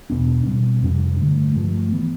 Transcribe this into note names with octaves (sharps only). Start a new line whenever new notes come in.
E2 B2 B3 D4
B2 G3 C4
F2 C3 G3 D4
G2 D3 A3
G2 F3 A3
E3 B3